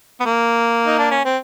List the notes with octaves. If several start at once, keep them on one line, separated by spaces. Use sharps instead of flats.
B3
A#3
D#4
D4
C#4
C4